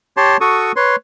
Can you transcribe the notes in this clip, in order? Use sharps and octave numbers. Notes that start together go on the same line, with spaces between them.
G4 C#5 A5 C6
F#4 A4 C#6 D#6
B4 C#5 C6